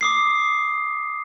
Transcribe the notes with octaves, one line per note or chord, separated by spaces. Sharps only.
D6 D#6 C7